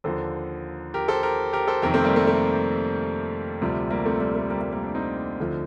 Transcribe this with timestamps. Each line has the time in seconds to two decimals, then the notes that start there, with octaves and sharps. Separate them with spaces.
0.04 D#2 D3 F3 A4 C5
0.94 G4 A#4
1.08 A4 C5
1.23 G4 A#4
1.53 G4 A#4
1.68 A4 C5
1.82 F2 C3 D#3 G4 A#4
1.94 A3 C4
2.04 G3 A#3
2.16 A3
2.27 A3
3.61 D2 C3 F3 G3
3.90 G3 A#3
4.06 A3 C4
4.20 G3 A#3
4.35 A3
4.50 G3 A#3
4.61 G3 A#3
4.72 G3 A#3
4.83 D4
4.95 C4 D#4
5.39 D2 D3 F3